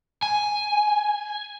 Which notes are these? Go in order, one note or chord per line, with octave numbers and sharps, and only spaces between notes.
G#5